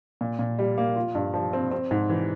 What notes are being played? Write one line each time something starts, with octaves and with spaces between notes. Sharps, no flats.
A#2
A#2
G3
A#3
F4
G2
F3
C4
C4
G#2
E3